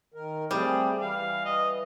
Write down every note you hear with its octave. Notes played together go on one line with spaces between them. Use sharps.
D#3 A#4
G3 A3 C4 G#4
E3 F5
D#5